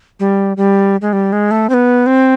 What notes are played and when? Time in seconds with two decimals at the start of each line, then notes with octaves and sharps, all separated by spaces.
0.20 G3
0.57 G3
1.02 G#3
1.13 G3
1.32 G#3
1.51 A3
1.69 C4
1.74 B3
2.06 C4